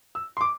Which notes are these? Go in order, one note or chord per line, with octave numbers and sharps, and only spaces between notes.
E6
C6
D6